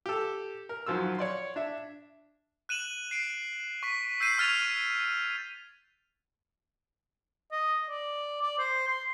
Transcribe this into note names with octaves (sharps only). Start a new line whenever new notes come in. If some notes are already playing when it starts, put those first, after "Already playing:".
G4 A4
A#4
F#2 D#3 F3 F#3 F4 E6
C#5 D5 C6
D4 E5
F#6 D#7 E7 F#7
C7 D7
C#6 B6
E6 G6 C7 D#7
C#6 F6 G#6 A6 F7
D#5
D5
D5
C5
C6